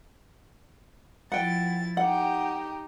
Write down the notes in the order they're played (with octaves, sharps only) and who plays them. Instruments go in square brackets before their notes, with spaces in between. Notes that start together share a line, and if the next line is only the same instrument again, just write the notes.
[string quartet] F3 E4 A6 [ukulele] F#5 G5
[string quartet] D#4 G4 [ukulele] F#5